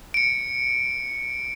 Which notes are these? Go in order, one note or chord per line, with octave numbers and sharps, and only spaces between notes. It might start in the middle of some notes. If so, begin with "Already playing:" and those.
C#7 D7